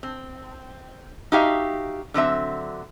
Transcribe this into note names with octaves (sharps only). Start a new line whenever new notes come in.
C4
D#4 F#4 G4 E5 F5
D3 F#3 C4 E5